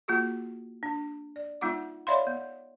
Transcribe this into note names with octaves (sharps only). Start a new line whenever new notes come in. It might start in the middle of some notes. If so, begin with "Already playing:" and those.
A#3 F4 F#4 G#4
D4
D5
G#3 B3 D#4 F4 F#5 D6
C#5 D5 E5 F5 B5 C6
B3